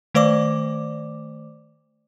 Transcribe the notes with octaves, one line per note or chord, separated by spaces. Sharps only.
D#3 A3 C5 D5 D6